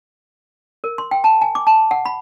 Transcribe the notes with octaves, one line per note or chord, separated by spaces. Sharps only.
A#4
C6
G5
A5
G#5
D6
A5
F#5
B5